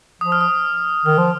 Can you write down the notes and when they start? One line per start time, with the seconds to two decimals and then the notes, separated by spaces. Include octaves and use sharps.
0.21 F3 D#6
0.32 F6
0.41 D#6
1.05 D#3 F6
1.18 F3